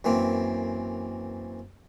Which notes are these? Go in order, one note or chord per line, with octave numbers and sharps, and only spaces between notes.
F#2 E3 A#3 C4